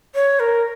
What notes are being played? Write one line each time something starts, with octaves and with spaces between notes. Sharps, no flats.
C#5
A#4